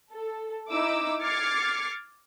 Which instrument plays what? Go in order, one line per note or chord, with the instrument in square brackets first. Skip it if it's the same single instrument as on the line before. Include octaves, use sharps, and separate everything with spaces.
[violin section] A4
D#4 E4 D6 E6
D6 F6 G#6 A6 C7 C#7